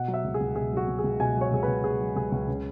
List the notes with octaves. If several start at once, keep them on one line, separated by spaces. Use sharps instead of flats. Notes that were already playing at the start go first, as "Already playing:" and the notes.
Already playing: B2 F#5
F#3
E5
C#2
G#4
C#2
B2 G#4
F#3 F#4
C#2
G#4
C#2
B2 G#5
F#3 C#5
C#2 G#4
C#2 B4
B2 G#4
F#3
C#2 G#4
C#2
C#3